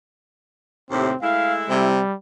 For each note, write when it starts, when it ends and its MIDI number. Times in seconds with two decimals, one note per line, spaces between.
0.91 1.12 39
0.91 1.12 45
0.91 1.12 48
0.91 1.17 60
1.22 1.89 56
1.22 1.89 57
1.22 1.89 64
1.22 1.54 77
1.70 2.00 48
1.70 2.14 55